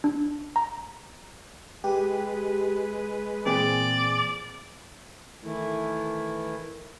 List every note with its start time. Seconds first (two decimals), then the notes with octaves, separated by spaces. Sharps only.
0.04 D4
0.56 A#5
1.84 G#3 G4 B4
3.46 A#2 E3 C4 G#4 D5
5.43 D#3 E3 A3 E4